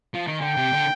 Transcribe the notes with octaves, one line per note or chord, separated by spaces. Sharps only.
F3
D#3
D3 G5
C3
D3